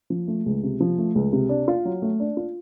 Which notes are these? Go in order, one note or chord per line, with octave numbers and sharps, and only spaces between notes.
F3
A3
C#2
C3
F3
A3
C#2
C3
D4
F4
F#3
A3
D4
F4